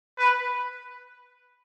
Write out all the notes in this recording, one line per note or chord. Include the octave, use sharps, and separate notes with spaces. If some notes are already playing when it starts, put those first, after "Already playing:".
B4